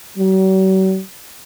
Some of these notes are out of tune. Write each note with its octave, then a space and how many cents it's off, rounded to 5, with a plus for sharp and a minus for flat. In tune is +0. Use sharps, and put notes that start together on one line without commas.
F#3 +45